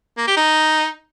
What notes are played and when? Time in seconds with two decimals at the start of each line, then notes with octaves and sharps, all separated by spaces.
0.18 A#3
0.27 G4
0.37 D#4